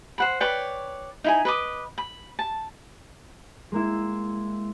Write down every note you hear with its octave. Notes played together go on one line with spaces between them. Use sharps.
C5 F#5 B5
B4 C#5 D5 G5
D#4 E4 G#5
B4 D#5 D6
B5
A5
G#3 A#3 E4